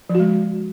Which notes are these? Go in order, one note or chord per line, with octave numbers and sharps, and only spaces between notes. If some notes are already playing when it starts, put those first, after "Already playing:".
F3
F#4
G#3